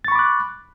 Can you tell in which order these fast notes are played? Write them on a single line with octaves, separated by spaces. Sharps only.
A6 C#6 B5 D6 F#6